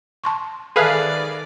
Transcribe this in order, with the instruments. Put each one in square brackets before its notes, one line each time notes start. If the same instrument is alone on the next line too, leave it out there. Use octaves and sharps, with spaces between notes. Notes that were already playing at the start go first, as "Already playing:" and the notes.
[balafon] A5 C6 C#6
[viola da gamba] D#3 D5 [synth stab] G#4 B4 F5 [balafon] A4 E5 A5